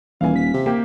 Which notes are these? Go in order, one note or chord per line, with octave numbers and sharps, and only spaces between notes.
D#1 E3 F5 G#5
B6
C3
A#3 G4